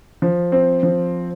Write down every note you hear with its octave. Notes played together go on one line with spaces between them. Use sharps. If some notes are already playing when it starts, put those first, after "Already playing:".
F3
C4
F3